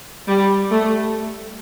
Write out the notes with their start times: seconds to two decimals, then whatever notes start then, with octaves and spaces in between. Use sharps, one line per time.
0.28 G3
0.71 A3